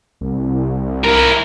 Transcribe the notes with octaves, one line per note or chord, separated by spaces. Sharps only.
C2
E4 A#4